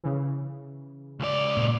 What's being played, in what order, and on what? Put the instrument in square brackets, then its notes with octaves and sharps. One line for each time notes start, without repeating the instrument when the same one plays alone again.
[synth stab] C#3 E3
[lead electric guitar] C#2 D5
[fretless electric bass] A#2